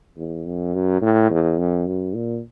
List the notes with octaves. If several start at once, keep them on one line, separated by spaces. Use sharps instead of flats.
E2
F2
F#2
A2
E2
F2
F#2
A#2